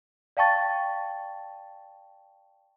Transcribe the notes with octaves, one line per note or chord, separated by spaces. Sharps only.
D5 F5 G5 A5 C#6 A6